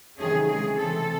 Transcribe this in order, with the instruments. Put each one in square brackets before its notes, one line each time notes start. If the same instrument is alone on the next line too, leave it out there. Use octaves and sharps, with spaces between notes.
[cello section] C3 D#3 F#3 A3 C#4 G#4
C#3 E3 G#3 G#4
C3 E3 A3 C4 A4